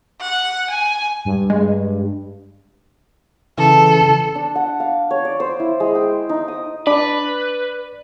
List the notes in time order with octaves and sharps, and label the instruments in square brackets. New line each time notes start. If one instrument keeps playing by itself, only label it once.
[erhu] F#5
G#5
[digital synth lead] G2
[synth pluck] G#3
[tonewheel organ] C#3 E3 [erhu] A4
[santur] D4
F#5
F5
C#5
D5
C5
E4
G#3
G5
D#4
D#6
[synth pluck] D4 [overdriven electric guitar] B4 [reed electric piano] D5